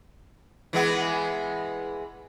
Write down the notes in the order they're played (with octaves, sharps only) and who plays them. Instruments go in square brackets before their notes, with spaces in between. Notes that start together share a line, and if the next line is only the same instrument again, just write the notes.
[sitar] E3 G#3 B3